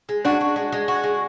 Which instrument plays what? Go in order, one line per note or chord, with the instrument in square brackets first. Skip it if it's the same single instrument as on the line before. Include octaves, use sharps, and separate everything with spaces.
[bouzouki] G#3
[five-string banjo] D4 [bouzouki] F#4
[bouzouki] F#4
G#3
G#3
F#4
G#3